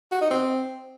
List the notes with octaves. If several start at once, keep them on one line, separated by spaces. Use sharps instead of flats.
F#4
D#4
C4